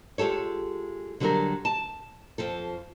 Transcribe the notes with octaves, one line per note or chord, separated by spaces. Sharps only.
G#3 F4 G4 A4 C#5
D3 F#3 G3 F#4 G4 A#4
A5
F2 F3 A4